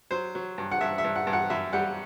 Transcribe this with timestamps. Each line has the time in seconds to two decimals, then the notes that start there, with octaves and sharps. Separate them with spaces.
0.11 F#3 C5
0.35 F#3
0.58 G2
0.71 F#5
0.81 G2 E5
0.98 E5
1.04 G2
1.16 F#5
1.27 G2
1.33 F#5
1.50 F#2 E5
1.73 G3 F#5